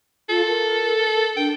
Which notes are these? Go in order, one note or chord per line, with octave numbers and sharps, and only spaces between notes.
F4 A4
A#4
D4 G5